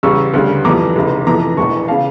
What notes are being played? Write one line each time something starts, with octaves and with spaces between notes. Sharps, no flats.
E2 C#3 G3 C#6 E6
D2 C#3 G3
F2 E3 G3 A#5 D6
F1 E2 C#3
F1 F2 E3 A#5 D6
E1 E2 E3 A5 C#6
C#3 F5 A5